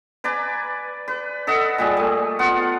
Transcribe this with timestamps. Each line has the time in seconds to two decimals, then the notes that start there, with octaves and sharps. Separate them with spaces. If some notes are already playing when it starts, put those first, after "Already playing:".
0.24 B4 D5 G#5 A#5
1.08 B4
1.47 A4 D#5 E5 F#5
1.78 A#2 G3 G#4
1.97 A3
2.39 B3 F4 F#5